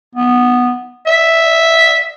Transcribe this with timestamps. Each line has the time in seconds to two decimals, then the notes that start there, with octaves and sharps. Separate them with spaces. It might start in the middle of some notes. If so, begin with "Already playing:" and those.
0.15 B3
1.07 E5